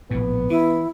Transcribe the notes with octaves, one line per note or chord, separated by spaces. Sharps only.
A#1 A2 B3
E3 E4